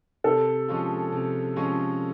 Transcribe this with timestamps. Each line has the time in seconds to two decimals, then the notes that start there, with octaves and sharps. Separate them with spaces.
0.24 C3 A4
0.68 F3 G#3 C#4 F4
1.12 C3
1.56 F3 G#3 C#4 F4